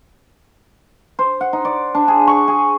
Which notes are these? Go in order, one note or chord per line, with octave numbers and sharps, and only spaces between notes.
C5
F#5
D#4
D5
D4
G#4
C#6
G#4